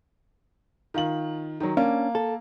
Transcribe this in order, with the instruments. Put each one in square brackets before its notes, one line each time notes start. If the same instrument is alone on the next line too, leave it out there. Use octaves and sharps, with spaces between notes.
[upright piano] D#3 F4 F#7
D#3 F#3
[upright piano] A#3 [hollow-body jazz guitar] C#4 D4
[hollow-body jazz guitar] A4